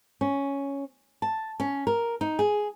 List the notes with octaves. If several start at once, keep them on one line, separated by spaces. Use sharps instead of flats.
C#4
A5
C#4
A#4
D#4
G#4